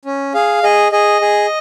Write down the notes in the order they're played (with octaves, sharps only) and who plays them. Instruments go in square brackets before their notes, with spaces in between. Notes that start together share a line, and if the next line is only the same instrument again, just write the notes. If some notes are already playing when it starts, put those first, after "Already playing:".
[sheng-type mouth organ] C#4
G#4 F5
G#4 D#5
G#4 D#5
G#4